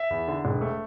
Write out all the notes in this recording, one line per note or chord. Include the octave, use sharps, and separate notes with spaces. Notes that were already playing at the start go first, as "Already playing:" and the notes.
Already playing: E5
E2
D3
E1
A3